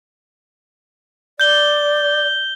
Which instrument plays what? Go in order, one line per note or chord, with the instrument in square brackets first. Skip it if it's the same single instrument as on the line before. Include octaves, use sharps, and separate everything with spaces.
[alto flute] D5 [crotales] G6 G7